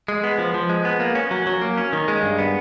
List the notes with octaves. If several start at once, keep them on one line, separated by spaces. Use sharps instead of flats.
G#3
B3
F3
F3
G#3
B3
A#3
C#4
F#3
F#3
A#3
C#4
D#3
G#3
G2
B3